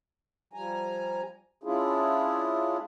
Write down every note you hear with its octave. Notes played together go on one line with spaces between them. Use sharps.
F3 G3 G#5 A#5
G#3 C#4 D4 E4 F4 G#4